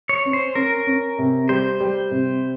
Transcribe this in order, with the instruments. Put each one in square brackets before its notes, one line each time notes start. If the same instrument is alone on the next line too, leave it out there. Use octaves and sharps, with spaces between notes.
[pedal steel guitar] C#5
[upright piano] C#4
[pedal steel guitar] C5
[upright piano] C#4 [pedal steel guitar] A#4
[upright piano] C#4
C3
[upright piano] G3 [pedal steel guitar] C5
[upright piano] G3
C3